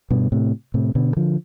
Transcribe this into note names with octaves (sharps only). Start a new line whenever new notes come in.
G2 B2
A2 C3
A2 C3
B2 D3
D3 F3